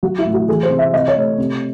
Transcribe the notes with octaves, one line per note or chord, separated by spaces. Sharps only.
F#3 F#4
E4
A2
F#4
E3 G#4
C5
C3
E5
C3 D#5
C#5
A3
C3